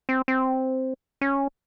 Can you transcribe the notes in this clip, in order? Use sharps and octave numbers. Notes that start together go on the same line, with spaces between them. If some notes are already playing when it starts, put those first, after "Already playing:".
C4
C4
C#4